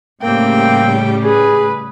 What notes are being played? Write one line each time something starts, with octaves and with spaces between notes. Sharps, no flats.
A2 C#3 G3 A#3 C4 G5
G#4 B4